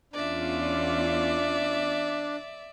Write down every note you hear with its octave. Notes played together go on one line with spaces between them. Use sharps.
E2 C#4 D4 F4 D5 E5